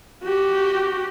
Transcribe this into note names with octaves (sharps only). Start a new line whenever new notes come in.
F#4 G4